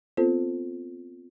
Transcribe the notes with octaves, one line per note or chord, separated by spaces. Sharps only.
B3 C4 F4 A4 C5